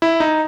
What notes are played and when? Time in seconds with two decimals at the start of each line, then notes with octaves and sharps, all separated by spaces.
0.02 E4
0.20 D#4